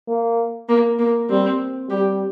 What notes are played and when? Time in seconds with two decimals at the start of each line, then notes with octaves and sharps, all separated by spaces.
0.08 A#3
0.68 A#3
0.99 A#3
1.29 G3 C4
1.89 G3 G4